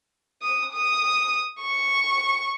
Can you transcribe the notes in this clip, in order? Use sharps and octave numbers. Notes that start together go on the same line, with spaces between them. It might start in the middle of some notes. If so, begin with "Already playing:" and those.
D#6
D#6
C#6